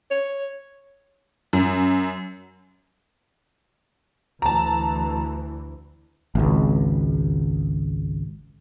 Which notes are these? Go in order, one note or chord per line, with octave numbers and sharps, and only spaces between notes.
C#5
F#2
D2 E3 A5 A#5
G#1 C#2